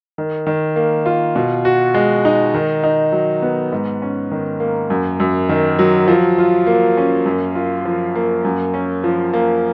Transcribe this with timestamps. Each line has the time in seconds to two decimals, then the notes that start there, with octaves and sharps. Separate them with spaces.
0.18 D#3
0.47 D#3
0.76 A#3
1.06 F4
1.36 B2
1.65 F#4
1.94 G#3
2.25 D#4
2.54 D#3
2.84 D#4
3.12 F#3
3.42 B3
3.72 G#2
4.02 C#4
4.32 D#3
4.60 A#3
4.90 F#2
5.20 F#2
5.49 D#3
5.79 F#3
6.08 F3
6.38 F4
6.67 A#3
6.97 C#4
7.26 F#2
7.55 F4
7.85 F3
8.15 A#3
8.45 F#2
8.74 C#4
9.04 F3
9.33 A#3